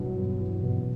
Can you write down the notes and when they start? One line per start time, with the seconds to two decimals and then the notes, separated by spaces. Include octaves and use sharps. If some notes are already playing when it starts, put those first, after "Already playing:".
Already playing: E2 G2 B2 F#3
0.16 B3
0.39 E2
0.62 B2